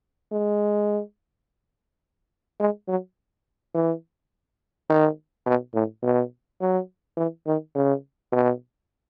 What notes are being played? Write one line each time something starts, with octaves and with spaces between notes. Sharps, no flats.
G#3
G#3
F#3
E3
D#3
B2
A2
B2
F#3
E3
D#3
C#3
B2